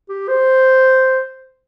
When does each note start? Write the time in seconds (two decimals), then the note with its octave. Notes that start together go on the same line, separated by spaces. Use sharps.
0.09 G4
0.28 C5